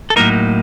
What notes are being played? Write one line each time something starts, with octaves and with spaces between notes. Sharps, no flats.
A4
A2 F#3 A#3 D#4 A#4